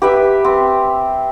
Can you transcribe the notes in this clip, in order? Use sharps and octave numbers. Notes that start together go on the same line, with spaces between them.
G4 B4 E5
C4